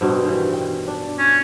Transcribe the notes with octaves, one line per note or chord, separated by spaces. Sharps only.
G2 B2 C4
D#3 E3
G5
D4
C#4